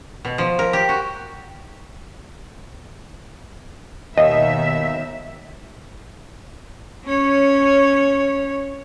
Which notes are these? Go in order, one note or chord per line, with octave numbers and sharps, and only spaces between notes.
B2
F3
A#4
G4
F#4
D#2 B2 D#3 D#5 E5
C#4 C#5